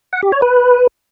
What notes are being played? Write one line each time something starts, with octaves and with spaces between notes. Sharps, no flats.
F#5
G4
C#5
B4